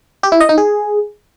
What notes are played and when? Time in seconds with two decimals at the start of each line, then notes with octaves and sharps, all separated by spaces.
0.23 G4
0.32 E4
0.40 D#5
0.49 D#4
0.58 G#4